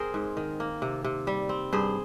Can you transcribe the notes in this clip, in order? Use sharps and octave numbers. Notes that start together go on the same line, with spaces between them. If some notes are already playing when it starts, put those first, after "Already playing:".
Already playing: C4 G#4 A#4 C5
G#2
D#3
A#3
C3
C3
G3
C4
G2 G#4 C5